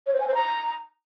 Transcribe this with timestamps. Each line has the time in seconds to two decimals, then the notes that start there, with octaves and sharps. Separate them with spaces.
0.06 C#5
0.13 C5
0.20 G#5
0.27 C5
0.34 A#5